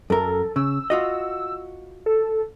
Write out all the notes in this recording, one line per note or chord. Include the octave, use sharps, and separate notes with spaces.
F#2 A4 A#4
C#3 E6
F4 F#4 D#5
A4